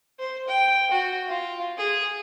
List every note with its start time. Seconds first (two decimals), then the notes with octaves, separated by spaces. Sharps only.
0.19 C5
0.48 G5
0.91 F#4
1.28 F4
1.78 G#4